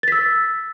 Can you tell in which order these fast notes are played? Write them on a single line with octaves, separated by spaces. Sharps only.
A6 B6 E6